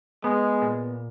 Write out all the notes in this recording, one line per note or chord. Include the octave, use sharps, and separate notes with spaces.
G#3 B3
A#2